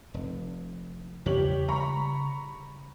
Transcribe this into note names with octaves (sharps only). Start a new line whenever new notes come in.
F1
E2 C#3 G4 C#5 F#7
G3 A#5 B5 C#6